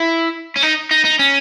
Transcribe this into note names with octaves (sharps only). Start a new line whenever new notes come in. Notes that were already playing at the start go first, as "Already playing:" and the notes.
Already playing: E4
C#4
D#4
D#4
D#4
C#4